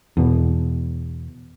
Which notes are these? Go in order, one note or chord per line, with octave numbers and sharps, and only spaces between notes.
E2 B2